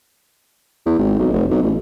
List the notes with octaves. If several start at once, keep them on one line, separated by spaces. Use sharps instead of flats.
E2
G#1
B1
F1
B1
A1